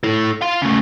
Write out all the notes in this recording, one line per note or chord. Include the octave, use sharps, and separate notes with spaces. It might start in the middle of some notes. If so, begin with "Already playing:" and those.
E4 A4
F5 C6
C#3 A3